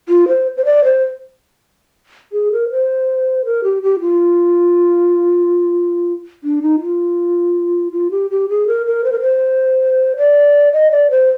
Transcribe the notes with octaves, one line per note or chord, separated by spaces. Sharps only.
F4
C5
C5
D5
C5
G#4
A#4
C5
A#4
G4
G4
F4
D4
D#4
F4
F4
G4
G4
G#4
A#4
A#4
C5
A#4
C5
D5
D#5
D5
C5